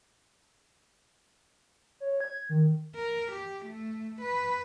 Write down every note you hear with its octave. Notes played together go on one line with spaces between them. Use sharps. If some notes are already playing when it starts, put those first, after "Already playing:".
C#5
G#6
D#3
A#4
G4
A3
B4